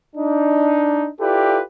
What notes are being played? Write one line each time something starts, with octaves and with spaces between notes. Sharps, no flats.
D4 D#4
E4 F4 G4 A4 B4 D5